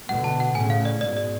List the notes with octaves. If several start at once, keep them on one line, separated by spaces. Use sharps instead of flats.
B2 D3 F#5
A5
F#5
A2 C#3 G#5
F5
D5
G#2 B2 D5
D5